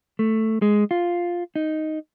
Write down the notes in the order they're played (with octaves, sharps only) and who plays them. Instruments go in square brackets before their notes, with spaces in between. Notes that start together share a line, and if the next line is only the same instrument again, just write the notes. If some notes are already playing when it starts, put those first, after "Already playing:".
[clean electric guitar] A3
G#3
F4
D#4